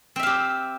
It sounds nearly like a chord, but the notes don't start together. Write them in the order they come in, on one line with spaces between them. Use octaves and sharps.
C4 E5 F5 G4